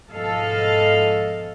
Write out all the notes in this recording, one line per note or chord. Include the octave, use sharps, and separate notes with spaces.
G#2 B2 F3 A4 D#5 F5